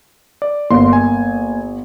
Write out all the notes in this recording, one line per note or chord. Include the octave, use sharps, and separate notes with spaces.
D5
G1 A#3 C6
G#5